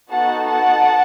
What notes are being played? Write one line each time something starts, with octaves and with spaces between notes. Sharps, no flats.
B3 D#4 F#4 A4 F#5 A5
F#5 A5